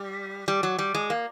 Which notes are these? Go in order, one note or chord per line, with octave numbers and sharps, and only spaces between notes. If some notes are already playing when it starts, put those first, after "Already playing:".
Already playing: G3
G3
F#3
G3
G#3
A#3